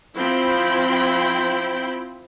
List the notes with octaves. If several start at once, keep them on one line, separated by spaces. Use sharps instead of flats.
F3 C4 E4 G5 B5 C6